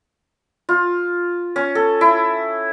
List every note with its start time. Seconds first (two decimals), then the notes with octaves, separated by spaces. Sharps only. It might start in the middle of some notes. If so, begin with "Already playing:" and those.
0.69 F4
1.56 C#4
1.75 A4
2.01 E4